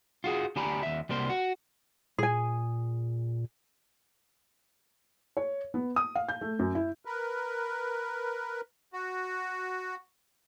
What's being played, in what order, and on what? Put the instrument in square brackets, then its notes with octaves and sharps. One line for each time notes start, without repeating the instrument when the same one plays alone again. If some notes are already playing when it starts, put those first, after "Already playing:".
[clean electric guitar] F4 F#4 G#4
D2 D4 G4 G#5 A#5 B5
D#2 E5
C2 G3 A#3 C5
F#4
[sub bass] A#2 [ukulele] G#4 G#5
[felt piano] C#5
B3
D#6
F5
G6
A3
F#2
E4
[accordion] A#4 B4
F#4